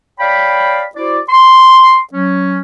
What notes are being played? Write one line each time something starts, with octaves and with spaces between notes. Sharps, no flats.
C#5 D5 F5 G5 B5
E4 F#4 C5 D5
C6
F#3 C#4